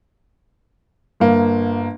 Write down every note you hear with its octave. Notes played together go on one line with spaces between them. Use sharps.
G1 A#3